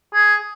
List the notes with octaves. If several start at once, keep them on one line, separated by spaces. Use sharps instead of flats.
G#4